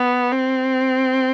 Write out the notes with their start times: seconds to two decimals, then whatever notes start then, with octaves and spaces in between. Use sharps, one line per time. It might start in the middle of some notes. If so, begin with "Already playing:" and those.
Already playing: B3
0.32 C4